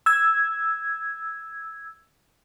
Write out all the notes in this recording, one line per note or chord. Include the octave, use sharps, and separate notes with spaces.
E6 G#6